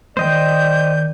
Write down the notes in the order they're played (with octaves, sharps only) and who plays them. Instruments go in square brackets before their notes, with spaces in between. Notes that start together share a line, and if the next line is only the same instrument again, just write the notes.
[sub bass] D#3 [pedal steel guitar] C5 D#5 G5 [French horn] D5 [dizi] G6